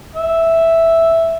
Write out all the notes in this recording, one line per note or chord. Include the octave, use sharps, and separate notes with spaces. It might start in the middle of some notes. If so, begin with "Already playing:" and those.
E5